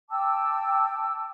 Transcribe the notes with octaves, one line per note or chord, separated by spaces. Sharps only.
G5 A5 D6 E6